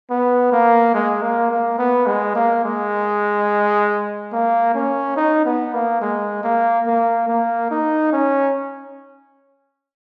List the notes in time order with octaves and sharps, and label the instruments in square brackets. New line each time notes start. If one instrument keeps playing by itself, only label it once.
[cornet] B3
A#3
G#3
A#3
A#3
B3
G#3
A#3
G#3
A#3
C#4
D#4
B3
A#3
G#3
A#3
A#3
A#3
D#4
C#4